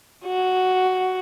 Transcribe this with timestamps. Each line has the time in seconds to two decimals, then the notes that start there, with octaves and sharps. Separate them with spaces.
0.25 F#4